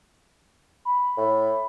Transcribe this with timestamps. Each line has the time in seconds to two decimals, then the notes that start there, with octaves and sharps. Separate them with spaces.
0.85 B5
1.17 A2